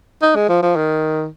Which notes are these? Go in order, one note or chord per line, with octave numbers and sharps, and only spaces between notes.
D#4
G#3
F3
F3
D#3